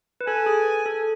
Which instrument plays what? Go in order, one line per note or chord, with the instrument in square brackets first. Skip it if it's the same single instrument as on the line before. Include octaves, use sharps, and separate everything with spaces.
[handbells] B4
[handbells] A4 [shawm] G#5
[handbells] G#4
A4